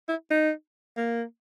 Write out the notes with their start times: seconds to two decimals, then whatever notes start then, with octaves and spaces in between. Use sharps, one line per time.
0.09 E4
0.31 D#4
0.97 A#3